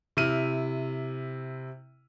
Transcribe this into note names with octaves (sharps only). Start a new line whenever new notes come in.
C3 E4 F6 D#7